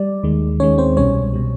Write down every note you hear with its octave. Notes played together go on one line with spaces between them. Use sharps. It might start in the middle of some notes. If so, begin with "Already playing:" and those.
Already playing: G3 D5
D#2 D#3 G#3
D#2 D#3 G#3 C#4 C#5
C4 C5
C2 B2 G3 C#4 C#5
B2 G3